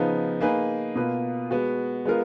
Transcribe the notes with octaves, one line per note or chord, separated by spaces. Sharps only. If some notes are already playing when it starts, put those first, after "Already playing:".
Already playing: C#3 F3 B3 D#4
A#3 D#4 G#4 B4
B2 A#3 F4 B4
G#3 B3 F#4
G#3 B3 F4 A#4